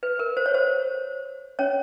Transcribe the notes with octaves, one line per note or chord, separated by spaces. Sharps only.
B4
A#4
C5
C#5
C5
C#4 C#5